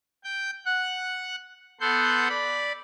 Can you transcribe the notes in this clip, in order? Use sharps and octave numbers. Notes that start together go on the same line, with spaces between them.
G5 G6
F#5 F#6
B3 A4 F#5 C6 G6
D5 B5